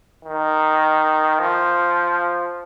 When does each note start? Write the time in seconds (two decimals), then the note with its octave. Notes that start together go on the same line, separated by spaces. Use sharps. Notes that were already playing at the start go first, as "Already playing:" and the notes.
0.25 D#3
1.40 F3